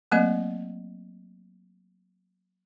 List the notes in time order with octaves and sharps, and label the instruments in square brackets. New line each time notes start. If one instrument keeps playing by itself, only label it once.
[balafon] F#3 A3 A#3 C4 D#5